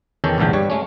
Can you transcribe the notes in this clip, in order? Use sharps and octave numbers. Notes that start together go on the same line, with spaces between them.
E2 D#3 C#4 A4 G5
A#1 E2 G#2 D3 A3 G5
G2 G3 C#5
G#3 A3 C#4